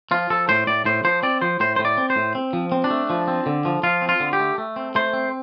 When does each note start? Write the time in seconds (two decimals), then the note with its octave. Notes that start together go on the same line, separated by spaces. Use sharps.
0.11 F3 F4
0.30 F3 A4
0.49 A2 C5
0.67 A2 D5
0.85 A2 C5
1.04 F3 C5
1.23 C4 D5
1.42 F3 C5
1.60 A2 C5
1.76 C5
1.79 A2
1.85 D5
1.98 C4
2.10 C5
2.16 A2
2.35 C4
2.53 F3
2.72 C4
2.84 D4
2.90 A3
3.10 F3
3.28 C4
3.46 D3
3.65 F3
3.83 F3 F4
4.02 C4
4.09 F4
4.20 D3
4.33 G4
4.39 A3
4.58 A3
4.76 C4
4.95 A3 C5
5.13 C4